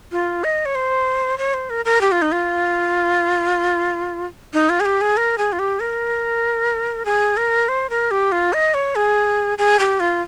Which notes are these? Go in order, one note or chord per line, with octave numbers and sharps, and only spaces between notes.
F4
D#5
C#5
C5
C#5
C5
A#4
A#4
G4
F4
D#4
F4
D#4
F4
G#4
G4
G#4
A#4
G#4
F4
G4
A#4
G#4
A#4
C5
A#4
G4
F4
D#5
C#5
G#4
G#4
G4
F4